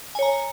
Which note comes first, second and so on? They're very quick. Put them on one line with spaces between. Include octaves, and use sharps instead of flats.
G#5 C#5 A#5